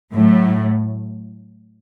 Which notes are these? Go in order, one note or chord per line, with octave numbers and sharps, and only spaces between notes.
A2 F#3 A3